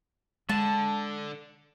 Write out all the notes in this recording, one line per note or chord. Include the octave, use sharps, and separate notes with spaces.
D3 G#3 A5